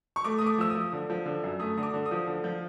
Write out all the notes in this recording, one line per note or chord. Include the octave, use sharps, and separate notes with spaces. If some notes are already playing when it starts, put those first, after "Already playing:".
C#6
A3 D6
A3 D#6
D6
F3 E6
F3 D#6
D3
F3
D3
F#2
A3 D#6
D3 D#6
D6
D3
D#6
F3
D3
F3